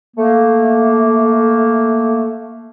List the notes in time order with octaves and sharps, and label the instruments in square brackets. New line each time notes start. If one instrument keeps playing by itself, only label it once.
[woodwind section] A3 A#3